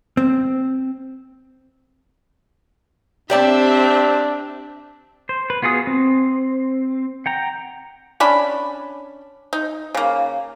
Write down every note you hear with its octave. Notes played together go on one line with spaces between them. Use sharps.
C4
C4 D4 G4 D5 E5 A5
C5
B4
B3 F4 F#4 G#4 D#6
C4
F#5 G5 A#5
C#4 D4 B5
D#4
C#3 A#3